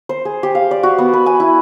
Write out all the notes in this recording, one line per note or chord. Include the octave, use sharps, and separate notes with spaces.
C5
G#4
G4
F5
D5
F#4
B3
B4
G#5
E4